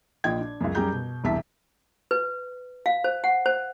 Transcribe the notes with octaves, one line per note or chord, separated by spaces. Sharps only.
A#1 A#2 D#5 G5 G#6
D4
C#2 F#2
F#2 G3 G4 G#4 A#5 G6
B2
E1 C2 E5 A5 B6
B4
F5
C5
F#5
C5